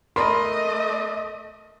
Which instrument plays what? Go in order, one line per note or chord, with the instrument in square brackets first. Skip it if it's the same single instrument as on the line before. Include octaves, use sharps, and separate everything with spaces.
[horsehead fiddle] A3 D#5 [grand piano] A#4 B5 C6